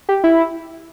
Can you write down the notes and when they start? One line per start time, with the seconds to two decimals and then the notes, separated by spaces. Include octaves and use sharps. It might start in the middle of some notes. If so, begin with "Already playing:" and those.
0.09 G4
0.24 E4